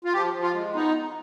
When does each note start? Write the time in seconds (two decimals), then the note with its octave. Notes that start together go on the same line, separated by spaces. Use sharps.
0.04 F4
0.13 F3 G4
0.34 F3
0.43 F4
0.53 G#3
0.74 B3 D#4